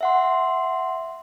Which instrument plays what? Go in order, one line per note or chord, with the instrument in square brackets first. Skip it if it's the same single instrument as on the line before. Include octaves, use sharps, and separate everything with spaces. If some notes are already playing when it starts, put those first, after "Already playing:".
[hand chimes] E5 F#5 C6